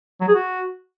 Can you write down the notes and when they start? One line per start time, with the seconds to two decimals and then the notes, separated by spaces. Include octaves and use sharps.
0.21 F#3
0.28 G#4
0.35 F#4